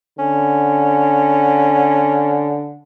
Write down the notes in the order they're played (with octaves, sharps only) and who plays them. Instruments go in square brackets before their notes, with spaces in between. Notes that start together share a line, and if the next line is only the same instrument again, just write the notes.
[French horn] D3 [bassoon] C#4